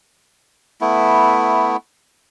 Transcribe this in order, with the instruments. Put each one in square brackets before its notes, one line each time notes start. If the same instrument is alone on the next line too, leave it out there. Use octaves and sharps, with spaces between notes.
[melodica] A3 B3 E4